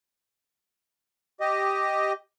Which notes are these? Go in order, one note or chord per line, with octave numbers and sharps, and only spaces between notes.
G4 D#5